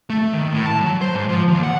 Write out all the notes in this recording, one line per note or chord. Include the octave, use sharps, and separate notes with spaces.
A3
D#3
A2
A5
F#3
C5
G#2
F3
D#2
F#5